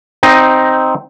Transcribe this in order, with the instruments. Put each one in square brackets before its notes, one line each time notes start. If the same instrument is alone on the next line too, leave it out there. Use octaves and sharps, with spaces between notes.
[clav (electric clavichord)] C4 D#4 D#5